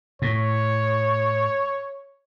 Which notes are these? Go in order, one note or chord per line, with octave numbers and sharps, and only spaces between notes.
A2 C#5